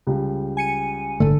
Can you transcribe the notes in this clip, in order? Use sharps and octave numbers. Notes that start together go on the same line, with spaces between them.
C#2 G3
G#5 C#7 D#7
G1 A2 D3 A3 A4